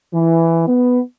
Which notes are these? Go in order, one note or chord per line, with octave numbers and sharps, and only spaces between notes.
E3
B3